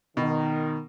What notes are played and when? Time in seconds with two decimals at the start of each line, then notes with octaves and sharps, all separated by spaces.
0.17 B2 D#3